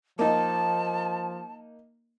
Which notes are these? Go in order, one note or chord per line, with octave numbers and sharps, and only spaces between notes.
F3 A#3 D#4 A5